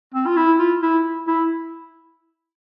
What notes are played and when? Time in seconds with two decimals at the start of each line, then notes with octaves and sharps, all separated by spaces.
0.14 C4
0.26 F4
0.36 E4
0.59 F4
0.82 E4
1.27 E4